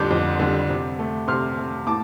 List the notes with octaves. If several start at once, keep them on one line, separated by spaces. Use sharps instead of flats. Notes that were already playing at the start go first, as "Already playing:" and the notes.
Already playing: F2 D3 G3 C6 D6 G6
F2
D3 G3
C3
A3
C3 C6 F6
A3
A2 A5 D6